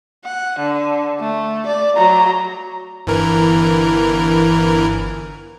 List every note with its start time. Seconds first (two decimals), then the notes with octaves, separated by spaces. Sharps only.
0.25 F#5
0.59 D3
1.20 A3
1.66 D5
1.97 F#3 A#5
3.07 G1 E3 A#4